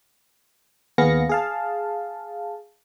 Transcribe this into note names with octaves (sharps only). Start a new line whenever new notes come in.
D#2 B3 G#4 F5 A#6 C#7
G#4 F5 A5